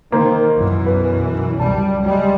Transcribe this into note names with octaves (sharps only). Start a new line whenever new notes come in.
D#3 A#3 C5
B1 F#2 E3
B4
C#2 G3 A5
G3 G#3